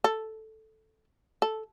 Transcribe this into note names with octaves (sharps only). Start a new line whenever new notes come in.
A4
A4